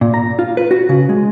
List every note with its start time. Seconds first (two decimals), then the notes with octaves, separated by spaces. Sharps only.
0.01 A#2
0.14 A#5
0.39 F4
0.57 B4
0.71 F#4
0.89 C#3
1.09 G#3